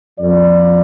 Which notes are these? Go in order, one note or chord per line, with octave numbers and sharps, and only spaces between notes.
F2 F3 D5